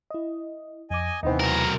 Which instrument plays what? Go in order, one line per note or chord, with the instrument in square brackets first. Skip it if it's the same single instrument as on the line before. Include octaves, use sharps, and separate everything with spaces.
[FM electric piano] E4 D#5
[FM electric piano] F2 D6 [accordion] D#5 G#5
[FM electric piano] D#2 C3 [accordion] E3 B3 [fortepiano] C4 D#4
[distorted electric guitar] B1 A#4